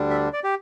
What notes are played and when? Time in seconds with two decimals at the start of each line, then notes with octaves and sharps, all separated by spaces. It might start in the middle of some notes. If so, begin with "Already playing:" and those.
Already playing: D2 D3 G3 D4
0.10 E5
0.33 D5
0.44 G4